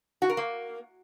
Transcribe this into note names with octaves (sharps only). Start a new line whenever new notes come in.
F#4
A#4
A#3